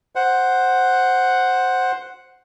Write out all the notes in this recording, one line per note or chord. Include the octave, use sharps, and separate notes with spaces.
C5 F#5